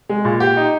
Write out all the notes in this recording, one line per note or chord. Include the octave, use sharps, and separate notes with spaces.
G#3
A#2
G4
D#4